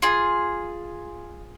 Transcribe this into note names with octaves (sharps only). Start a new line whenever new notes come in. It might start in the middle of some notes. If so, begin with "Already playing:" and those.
F4 G#4